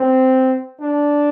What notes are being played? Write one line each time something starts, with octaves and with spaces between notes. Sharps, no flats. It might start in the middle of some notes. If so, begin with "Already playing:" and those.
Already playing: C4
D4